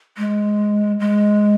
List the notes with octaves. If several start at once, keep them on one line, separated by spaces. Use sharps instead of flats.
G#3
G#3